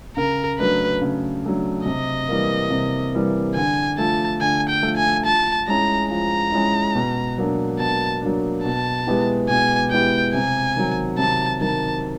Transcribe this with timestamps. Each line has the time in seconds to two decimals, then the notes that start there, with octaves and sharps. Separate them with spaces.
0.17 C#3 A#4
0.59 F#3 A3 D4 B4
1.02 C#3
1.44 F#3 A3 D4
1.86 C3 D#5
2.29 E3 G3 A#3
2.71 C3
3.13 E3 G3 A#3
3.56 D3 G#5
3.98 F3 A3 A5
4.41 D3 G#5
4.69 G5
4.83 F3 A3
4.97 G#5
5.25 F3 A5
5.68 G#3 C#4 E4 A#5
6.10 F3 A#5
6.52 G#3 C#4 E4
6.95 B2
7.38 F#3 A#3 D4
7.79 B2 A5
8.22 F#3 A#3 D4
8.64 B2 A5
9.07 G#3 B3 E4 G4
9.49 B2 G#5
9.91 G#3 B3 E4 G4 G5
10.34 C3 G#5
10.76 D#3 F#3
11.19 C3 A5
11.61 D#3 F#3 A5